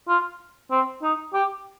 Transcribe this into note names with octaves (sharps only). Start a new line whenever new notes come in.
F4
C4
D#4
G4